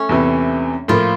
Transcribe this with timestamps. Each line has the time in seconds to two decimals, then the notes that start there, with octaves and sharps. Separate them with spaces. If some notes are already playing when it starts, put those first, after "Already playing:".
Already playing: A3 C#4
0.09 E2 C3 E3
0.88 A2 F3 A#3 F4